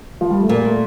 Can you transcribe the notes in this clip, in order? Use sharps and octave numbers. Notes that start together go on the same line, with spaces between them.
F3
G3
A3
A#2 A#3
A3